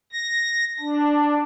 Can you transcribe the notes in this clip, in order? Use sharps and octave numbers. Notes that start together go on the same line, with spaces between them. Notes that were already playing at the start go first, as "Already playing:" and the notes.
A#6
D4